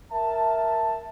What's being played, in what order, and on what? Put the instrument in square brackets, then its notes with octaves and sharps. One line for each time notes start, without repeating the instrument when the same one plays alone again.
[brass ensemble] A#4 E5 A5